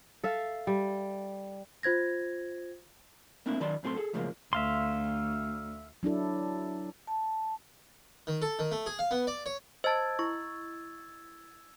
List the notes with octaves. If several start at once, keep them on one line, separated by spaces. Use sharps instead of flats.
A4 E5 F5
G3
F4 C5 G#6 A#6
A3 A#3 C4 D4 E4
D#3 F#3 D5 A5 B5 C6
F#2 A2 C4 G#4 A4 C6
G#4 A4
F#2 A2 C#3 F3 G#3 A#3
D2 E5 F5 C6
F#3 D4 E4 A4
A5
D#3
A4
D#3
A3
G#4
F5
B3
D5
C#5
C5 D#5 A5 E6 G#6 A6
E4 C#6